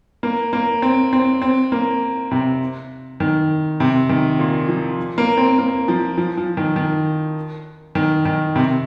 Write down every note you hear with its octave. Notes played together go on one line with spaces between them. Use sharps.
A#3
A#3
C4
C4
C4
A#3
C3
D#3
C3
D#3
A#2
F3
A#3
C4
A#3
F3
F3
F3
D#3
D#3
D#3
D#3
C3